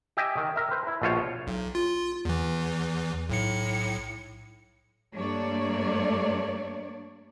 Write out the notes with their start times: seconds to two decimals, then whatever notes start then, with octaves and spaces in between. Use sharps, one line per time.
0.17 G4 D#5 E5 G5 G#5
0.37 D#3
0.56 A#4 E5
0.71 B4 C5
0.87 E4
1.02 A#1 B2 F4 C5 C#5
1.47 B1
1.75 F4
2.25 E2 E3
3.29 B1 A2 C#7
5.14 G2 A3 A#3 D4 C#5 D5